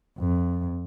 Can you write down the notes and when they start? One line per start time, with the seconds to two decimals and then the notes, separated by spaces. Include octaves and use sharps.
0.18 F2